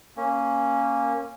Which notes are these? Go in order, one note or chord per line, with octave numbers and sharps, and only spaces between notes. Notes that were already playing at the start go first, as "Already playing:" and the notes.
A#3 C#4